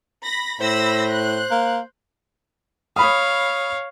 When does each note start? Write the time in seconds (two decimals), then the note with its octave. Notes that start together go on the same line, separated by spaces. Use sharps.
0.23 B5 A#6
0.61 A2 C5 B5 E6 A#6
1.11 F#6
1.51 A#3
2.96 C#5 F5 B5 D#6